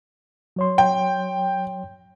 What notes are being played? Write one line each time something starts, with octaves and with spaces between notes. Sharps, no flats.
F#3 C#5 C6
G5